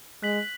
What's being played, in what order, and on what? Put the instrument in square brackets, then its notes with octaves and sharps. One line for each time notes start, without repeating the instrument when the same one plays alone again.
[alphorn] G#3 [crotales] F#6 B6 F#7